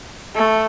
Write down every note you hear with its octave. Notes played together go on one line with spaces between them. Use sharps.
A3